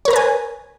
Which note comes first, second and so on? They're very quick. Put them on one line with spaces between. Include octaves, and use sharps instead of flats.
C#5 A#4 A#5 B4 G#5